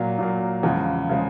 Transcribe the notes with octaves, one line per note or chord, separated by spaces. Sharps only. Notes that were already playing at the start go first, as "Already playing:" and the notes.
Already playing: A#2 F#3 A#3
A#2 F#3 A#3
E2 C#3 F3 G#3
C#3 F3 G#3